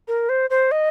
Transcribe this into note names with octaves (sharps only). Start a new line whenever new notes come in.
A#4
C5
C5
D#5